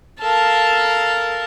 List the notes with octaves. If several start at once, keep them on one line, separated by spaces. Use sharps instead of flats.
A4 A#4 F5 A5